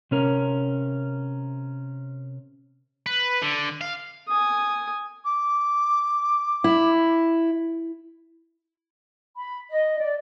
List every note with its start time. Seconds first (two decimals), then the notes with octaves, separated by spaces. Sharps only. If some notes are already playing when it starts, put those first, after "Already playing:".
0.11 C3 C#4 A#4
3.06 B4
3.42 D3
3.81 F5
4.28 G#5 D#6
5.25 D6
6.64 E4
9.37 B5
9.70 D#5
10.00 D5